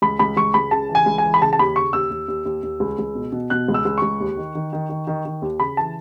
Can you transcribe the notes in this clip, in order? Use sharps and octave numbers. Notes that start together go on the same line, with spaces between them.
C#2 B5
C#2 B5
C#2 C#6
C#2 B5
C#3 A5
E3
G#5
C#2
G#5
E3
B5
C#3 A5
A5
D#2 B5
C#3 C#6
D#2 E6
D#2
D#2
D#2
D#2
C#2
C#2
B2
B2
B2 F#6
C#2
E6
C#2
C#2 C#6
D#2
D#3
D#3
D#3
D#3
D#3
D#3
D#2
C#3 B5
E3 A5